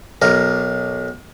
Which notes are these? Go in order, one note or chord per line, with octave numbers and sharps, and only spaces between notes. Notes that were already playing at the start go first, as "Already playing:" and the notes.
B1 A#4